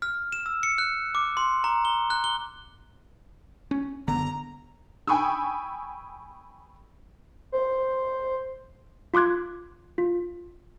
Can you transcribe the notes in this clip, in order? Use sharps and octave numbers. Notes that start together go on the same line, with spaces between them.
F6
E7
E6
C#7
F#6
D6
C6
A#5
G7
F#6
G7
C#4
F#1 D3 B3 A#5
G5 G#5 B5 C#6 D#6 E6
C5
F4 C6 D6 F#6 G#6
F4